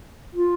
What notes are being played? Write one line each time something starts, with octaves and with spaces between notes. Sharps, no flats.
F4